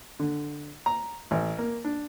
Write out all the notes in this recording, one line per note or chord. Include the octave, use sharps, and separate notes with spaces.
D3
A#5
A1
A#3
D4